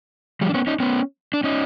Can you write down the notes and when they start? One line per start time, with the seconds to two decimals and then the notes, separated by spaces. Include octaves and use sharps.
0.41 F3 G3
0.49 D4
0.54 B3 C#4
0.67 C#4 D#4
0.80 B3 C#4
1.34 D4
1.44 C#4 D#4